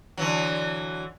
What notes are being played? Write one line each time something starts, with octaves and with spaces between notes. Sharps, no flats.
D3 E3 F#3